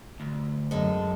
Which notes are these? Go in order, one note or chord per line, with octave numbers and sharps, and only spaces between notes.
D2
F#2 G#3 A4